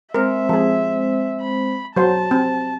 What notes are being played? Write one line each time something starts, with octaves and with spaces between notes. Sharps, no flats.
G#3 C4 A#4 C5 E5
F3 G#4
B5
F#3 C5 A5
C4